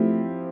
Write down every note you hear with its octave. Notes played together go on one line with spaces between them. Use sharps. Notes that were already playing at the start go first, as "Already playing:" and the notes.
Already playing: F3 A3 C4 E4 G4